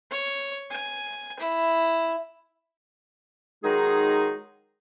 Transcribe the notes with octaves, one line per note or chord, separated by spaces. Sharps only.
C#5
G#5
E4
D#3 F#3 G#3 D#4 G#4